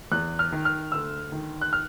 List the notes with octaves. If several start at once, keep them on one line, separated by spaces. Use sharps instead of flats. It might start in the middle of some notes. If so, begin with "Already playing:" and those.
E2 F#6
F6
D#3
F6
D2 E6
D#3
F#6
F6